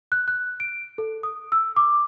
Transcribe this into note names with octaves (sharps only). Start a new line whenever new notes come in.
F#6
F#6
D7
A4
D#6
E6
D6